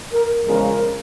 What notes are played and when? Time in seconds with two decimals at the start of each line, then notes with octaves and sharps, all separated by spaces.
0.12 A#4
0.46 E2 C#3 F3 G#3 A#4